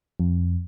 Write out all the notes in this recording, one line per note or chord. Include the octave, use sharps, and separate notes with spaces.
F2